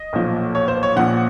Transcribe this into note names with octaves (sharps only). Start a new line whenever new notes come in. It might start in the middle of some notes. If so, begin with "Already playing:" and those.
Already playing: D#5
B1 A#2 F3
C#5
C5
C#5
A#1 A#2 F3 F#5